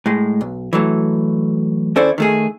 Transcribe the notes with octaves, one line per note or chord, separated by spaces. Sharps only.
A2 G#3
B1
E3 F#3 A3
D#2 C#4 E4 A4 C5 D5
D#3 A3 G#4